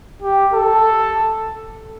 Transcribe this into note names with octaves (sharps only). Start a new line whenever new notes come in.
G4
A4